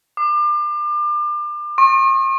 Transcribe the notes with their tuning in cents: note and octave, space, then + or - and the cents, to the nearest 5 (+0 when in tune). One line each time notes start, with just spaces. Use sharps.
D6 +35
C#6 -45